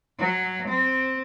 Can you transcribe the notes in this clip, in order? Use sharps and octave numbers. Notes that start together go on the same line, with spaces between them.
F#3
C4